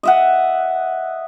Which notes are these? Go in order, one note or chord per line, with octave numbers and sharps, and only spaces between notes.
D#5 E5 F#5